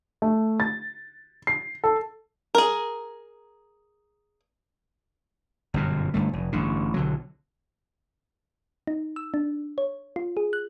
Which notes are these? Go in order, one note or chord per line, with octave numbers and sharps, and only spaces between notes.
A3
A6
C7
A4
G#4 A#4
G1 F#2 B2
G1 G2 A3
F1
A1 G2 D3
B1 D3 F#3
D#4
E6
D4
C#5
F4
G#4
F#6